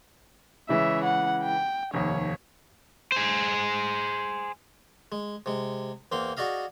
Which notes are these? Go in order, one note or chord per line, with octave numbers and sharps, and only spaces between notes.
C#3 E3 G#3 C#5 E5
F#5
G5
F1 D#2 C#5
G#4 C5
G#3
C3 G#3
E2 A#3 C4 C6
F#4 G#4 D5 D#5 F5